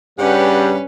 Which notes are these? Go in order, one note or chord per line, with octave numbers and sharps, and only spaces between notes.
G2 C#3 G3 C#4 G4 B4 F#5